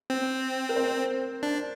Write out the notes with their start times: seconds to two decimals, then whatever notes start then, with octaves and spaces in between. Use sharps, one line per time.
0.10 C4
0.69 A#4
0.76 C5
1.43 D4